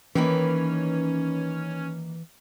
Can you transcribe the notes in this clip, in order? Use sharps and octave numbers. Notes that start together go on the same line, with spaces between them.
D#3 E3 A#3 C#4 B4